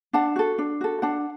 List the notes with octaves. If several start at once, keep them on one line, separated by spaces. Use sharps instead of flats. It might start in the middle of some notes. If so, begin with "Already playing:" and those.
D4 F#5 A5
F#4 A4
D4
F#4 A4
D4 F#5 A5